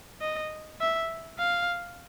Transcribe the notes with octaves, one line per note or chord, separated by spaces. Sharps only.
D#5
E5
F5